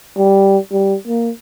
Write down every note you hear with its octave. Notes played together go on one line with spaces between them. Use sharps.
G3
G3
A#3